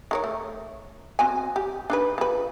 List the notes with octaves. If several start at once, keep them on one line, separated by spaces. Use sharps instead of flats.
D#3 A#4 C#5
A3
C4 F#4 G#5
G4
D4 D#4 B4
F3 B4